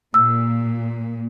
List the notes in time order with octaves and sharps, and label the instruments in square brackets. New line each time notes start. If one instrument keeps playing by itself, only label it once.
[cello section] A#2 [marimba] E6